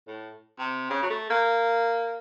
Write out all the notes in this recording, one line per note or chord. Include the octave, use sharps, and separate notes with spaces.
A2
C3
C#3
F#3
A3
A#3